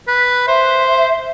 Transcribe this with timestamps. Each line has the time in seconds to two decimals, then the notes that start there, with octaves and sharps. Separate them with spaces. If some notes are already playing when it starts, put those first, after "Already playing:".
0.08 B4
0.48 C5 E5